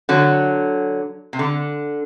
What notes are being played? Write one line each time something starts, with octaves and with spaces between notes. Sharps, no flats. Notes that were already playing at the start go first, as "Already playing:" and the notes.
D3 F#3
C3
D3